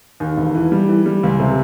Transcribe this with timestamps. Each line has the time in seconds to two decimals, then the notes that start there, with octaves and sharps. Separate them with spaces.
0.20 D#2
0.37 E1
0.55 E3
0.72 G3
0.89 E3
1.06 G3
1.23 C#2
1.40 C3